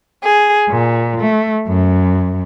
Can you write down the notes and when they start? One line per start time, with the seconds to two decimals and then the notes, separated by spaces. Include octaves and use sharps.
0.22 G#4
0.69 A#2
1.20 A3
1.68 F#2